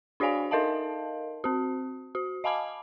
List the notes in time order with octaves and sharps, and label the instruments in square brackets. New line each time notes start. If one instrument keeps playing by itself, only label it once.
[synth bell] D4 F#4 C#5 D5 F5 G#5
D#4 A#4 D#5 F5 A5
C4 F#4
F#4
D#5 F5 G#5 A5 B5 D6